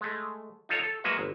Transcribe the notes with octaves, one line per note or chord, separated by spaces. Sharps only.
G#3 A3
D#4 F4 A4 C#5 A#5
A4
F#3 G#3 A#3 F#4 B4 E5
G1